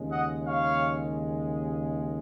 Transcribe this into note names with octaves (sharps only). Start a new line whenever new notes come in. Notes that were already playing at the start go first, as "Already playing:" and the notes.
Already playing: D#2 C#3 G#3
D#5 F#5
C#5 F5